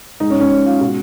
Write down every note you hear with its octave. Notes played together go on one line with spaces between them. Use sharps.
G#2 D#4
C#4
G#2
C#4
G#2
G#2 F4
B2 F#4